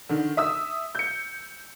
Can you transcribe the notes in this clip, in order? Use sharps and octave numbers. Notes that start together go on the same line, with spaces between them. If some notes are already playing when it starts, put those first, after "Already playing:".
D3 D#3
E5 D#6 E6
G6 C#7